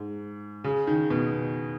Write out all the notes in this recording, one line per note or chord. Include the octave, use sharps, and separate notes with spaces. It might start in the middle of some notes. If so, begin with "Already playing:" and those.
Already playing: G#2
C#3
D#3
B2